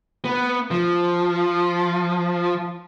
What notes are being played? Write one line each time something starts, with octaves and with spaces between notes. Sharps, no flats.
B3
F3